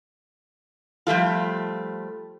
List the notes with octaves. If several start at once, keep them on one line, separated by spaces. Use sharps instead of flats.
F3 G3 A3 F4